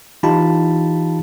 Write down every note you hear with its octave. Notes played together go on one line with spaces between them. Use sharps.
E3 D#4 F4 G4 A5 B5